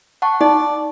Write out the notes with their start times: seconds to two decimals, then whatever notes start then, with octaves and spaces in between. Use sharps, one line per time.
0.22 F#5 A5 C#6
0.41 D#4 D5